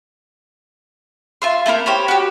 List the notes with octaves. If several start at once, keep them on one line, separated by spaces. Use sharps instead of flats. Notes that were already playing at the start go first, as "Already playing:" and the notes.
F4 E5 C6
A3 A#3 E4 A#4
G4 C5 C#5 B5
F#4 G4